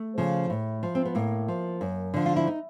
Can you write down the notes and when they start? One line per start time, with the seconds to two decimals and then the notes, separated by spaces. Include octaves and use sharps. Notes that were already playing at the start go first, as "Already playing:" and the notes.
Already playing: A3
0.18 C#3 F3
0.50 A2
0.83 F3
0.95 C4
1.05 B3
1.15 A2 A#3
1.48 F3
1.81 F#2
2.14 D3 F3
2.26 F4
2.36 E4
2.47 D#4